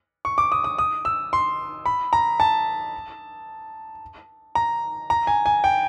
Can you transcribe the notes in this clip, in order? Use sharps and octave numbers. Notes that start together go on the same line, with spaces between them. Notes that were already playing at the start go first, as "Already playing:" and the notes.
C#6
D6
D#6
D#6
D#6
E6
C6
B5
A#5
A5
A#5
A#5
G#5
G#5
G5